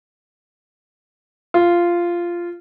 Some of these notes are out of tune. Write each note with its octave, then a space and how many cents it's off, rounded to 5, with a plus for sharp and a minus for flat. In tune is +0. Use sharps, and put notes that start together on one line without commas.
F4 -10